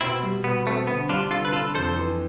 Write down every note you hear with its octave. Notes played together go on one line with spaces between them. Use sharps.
B2 C4 E4
G3
B2 B3
A3 C4
D3 B3
G3 D4 F4
D3 F4 A4
B4
D4 F4 A4
F2 A4 C5
E3